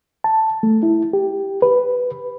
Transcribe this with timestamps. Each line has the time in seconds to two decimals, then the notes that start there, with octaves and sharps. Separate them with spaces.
0.24 A5
0.63 A3
0.83 E4
1.13 G4
1.62 B4